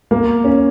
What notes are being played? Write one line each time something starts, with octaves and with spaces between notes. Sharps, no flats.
A#3
C#4